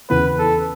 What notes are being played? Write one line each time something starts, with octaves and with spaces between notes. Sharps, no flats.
E2 C#3 E3 B3 B4
A4